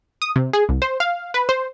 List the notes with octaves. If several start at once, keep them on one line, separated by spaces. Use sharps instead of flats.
D#6
C3
G#4
C2
C5
F5
B4
C5